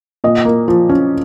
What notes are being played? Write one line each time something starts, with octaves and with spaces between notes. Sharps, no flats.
A#2 D#5
A#3
F3
C#4